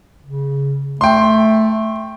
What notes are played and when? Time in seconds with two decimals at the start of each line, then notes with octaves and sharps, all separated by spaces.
0.24 C#3
1.01 A3 G5 C6